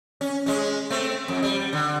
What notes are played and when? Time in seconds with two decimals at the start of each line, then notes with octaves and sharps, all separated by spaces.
0.21 C#4
0.46 G#3 C#4
0.90 A3 C4
1.28 F2
1.43 G3
1.73 D3